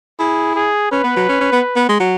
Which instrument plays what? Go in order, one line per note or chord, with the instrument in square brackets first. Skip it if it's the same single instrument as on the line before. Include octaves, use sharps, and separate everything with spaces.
[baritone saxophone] E4 [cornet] G#4
[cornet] G#4
[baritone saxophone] C#4 [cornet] B4
[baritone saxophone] B3
F#3
C#4
C#4
B3
B3
G#3
F#3